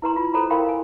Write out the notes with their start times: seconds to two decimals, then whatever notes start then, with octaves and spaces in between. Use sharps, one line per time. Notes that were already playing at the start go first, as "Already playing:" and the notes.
0.02 E4 B4 A#5 C6
0.16 F4
0.34 A4 C5 A#5 B5
0.50 E4 A#4 F5 G5 B5 C6
0.69 G#5